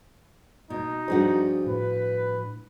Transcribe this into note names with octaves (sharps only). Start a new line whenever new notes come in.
B2 D#4
G2 F3 D4 F#4 G#4 C5
A2 B4